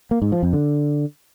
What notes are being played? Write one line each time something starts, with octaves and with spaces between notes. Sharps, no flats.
A#3
G#2
F3
F2
D3